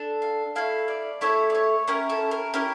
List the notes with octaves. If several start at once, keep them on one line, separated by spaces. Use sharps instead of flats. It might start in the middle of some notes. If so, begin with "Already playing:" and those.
Already playing: D4 A4
F5
A3 E4 A4 F5
D5
A3 E4 A4 C#5
D5
C#5
C#4 E4 G4 A#4
A4
A#4
C#4 E4 G4 A#4